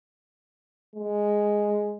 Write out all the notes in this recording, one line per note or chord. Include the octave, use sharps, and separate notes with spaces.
G#3